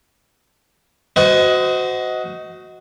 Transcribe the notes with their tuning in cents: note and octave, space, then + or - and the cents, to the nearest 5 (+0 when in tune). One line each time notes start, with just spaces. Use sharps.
F#4 +0 C5 -30 D#5 +15